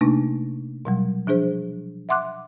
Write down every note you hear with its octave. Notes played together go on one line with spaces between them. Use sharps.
C3 A3 A#3 D4 D#4
B2 F#3 G3
F3 D4 G#4 C5
E5 F#5 C6 D6 F#6